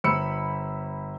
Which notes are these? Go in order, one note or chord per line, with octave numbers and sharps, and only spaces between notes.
G1 C5 B5 E6 C#7